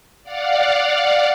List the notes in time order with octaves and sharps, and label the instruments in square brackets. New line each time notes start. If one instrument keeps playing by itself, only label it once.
[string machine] D5 F5 F#5